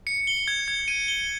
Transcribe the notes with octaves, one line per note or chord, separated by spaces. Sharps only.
C#7
G7
G#6
G#6
D#7
G7